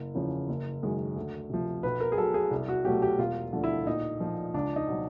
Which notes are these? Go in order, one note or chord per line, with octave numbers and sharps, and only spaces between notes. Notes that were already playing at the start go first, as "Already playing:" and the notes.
Already playing: F#1
E2 C#3 F3
F#1
F#2 D#3 G#3
D2
C3 F3
B1 B4
A#4
G#4
B2 F#3 A4
G#4
C2
F#4
B2 F#3 A3 G4
G4
E1 F4
D2 D3 F3 A3
E4
A#1 D#4
A#2 F3
C#2 D4
D#4
B2 F#3